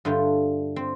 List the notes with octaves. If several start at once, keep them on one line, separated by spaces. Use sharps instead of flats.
G2 D3 A3 F4
C4